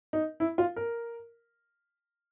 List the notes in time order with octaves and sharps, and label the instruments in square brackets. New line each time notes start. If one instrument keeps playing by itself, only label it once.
[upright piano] D#4
E4
F4
A#4